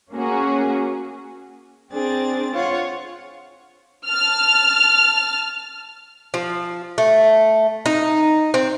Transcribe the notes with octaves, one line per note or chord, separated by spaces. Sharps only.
A#3 C#4 F#4 G#4
C4 D4 G#4 A6
F4 C#5 F5 F#5
A5 F6
F3
A3
D#4
C4